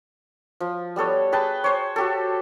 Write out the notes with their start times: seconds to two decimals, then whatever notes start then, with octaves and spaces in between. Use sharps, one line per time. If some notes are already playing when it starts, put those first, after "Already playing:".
0.60 F3
0.96 G3 B3 A4 C#5
1.32 G#4 B4 G5 A5
1.64 C5 C#5
1.96 F#4 G4 A4